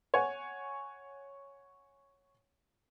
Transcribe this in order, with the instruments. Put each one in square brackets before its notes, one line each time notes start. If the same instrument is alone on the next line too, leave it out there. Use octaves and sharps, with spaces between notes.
[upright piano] C#5 F#5 G#5